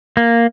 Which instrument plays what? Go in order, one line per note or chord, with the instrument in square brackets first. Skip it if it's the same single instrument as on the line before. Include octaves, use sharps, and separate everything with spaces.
[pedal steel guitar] A#3